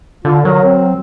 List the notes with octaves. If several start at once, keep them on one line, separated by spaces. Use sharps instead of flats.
D3 F4
F#3 A#4
C4